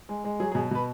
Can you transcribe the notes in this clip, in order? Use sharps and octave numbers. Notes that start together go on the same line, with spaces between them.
G#3
G#3
F#3 G#4
G#4
B2
B2 B4